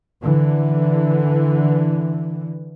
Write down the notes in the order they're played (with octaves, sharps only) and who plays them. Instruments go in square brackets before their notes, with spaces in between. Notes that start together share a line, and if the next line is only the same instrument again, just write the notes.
[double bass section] D3 E3